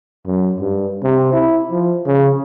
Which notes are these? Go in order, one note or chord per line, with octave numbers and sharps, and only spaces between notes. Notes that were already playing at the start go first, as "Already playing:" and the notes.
F#2
G2
C3
E4
F3
C#3